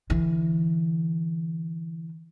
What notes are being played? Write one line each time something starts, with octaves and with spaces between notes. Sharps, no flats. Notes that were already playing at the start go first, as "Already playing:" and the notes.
D3 E3